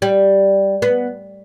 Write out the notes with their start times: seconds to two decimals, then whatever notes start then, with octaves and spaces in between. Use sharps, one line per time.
0.02 G3
0.82 B3